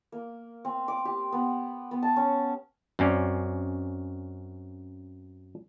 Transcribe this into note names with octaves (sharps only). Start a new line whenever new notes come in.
A#3
C4
D6
G4
B3
B3
A5
C#4
F#2 C4 C#4 D5